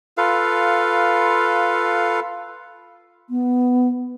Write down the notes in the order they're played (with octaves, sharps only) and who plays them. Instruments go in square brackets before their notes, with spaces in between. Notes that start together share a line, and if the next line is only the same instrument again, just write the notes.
[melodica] F4 A4 B4 F5
[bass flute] B3